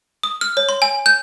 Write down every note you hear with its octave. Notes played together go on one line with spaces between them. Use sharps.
D#6
F6
C#5
C6
G#5
G6